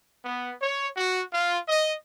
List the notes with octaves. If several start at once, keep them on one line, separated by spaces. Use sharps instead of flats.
B3
C#5
F#4
F4
D#5